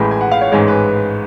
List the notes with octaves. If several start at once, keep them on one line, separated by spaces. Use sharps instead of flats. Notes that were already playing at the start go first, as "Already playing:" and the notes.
Already playing: A1 A2 G#3 B5
G#5
F#5
F5
C#5
A1 G#2 G#3 C#5
B4